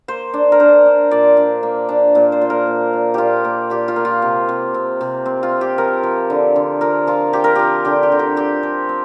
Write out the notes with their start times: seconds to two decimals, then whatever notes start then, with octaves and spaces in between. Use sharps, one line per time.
0.08 A#3 C5
0.34 D4
0.52 A#4
0.60 D4 C5
0.86 D4
1.11 A#2 D5
1.37 D4
1.63 A#3
1.89 D4
2.15 A#2
2.32 C5
2.41 A#2
2.50 A#4
2.67 A#2
2.93 A#2
3.14 A#2 F4 G4
3.45 A#3
3.70 A#2 G4
3.88 F4
3.96 A#3
4.05 F4
4.22 C3
4.49 C3
4.74 C4
5.01 C3
5.26 C4
5.43 F4
5.52 C4
5.61 G4
5.78 F3 A#4
6.03 F3
6.30 D3
6.56 D3
6.81 F3 A#4
7.07 F3 F4
7.33 F3 G4
7.44 A#4
7.55 F3 G4
7.85 D3 G4
8.03 G4
8.12 D3
8.19 G4
8.36 C4 G4
8.63 F3
8.89 C4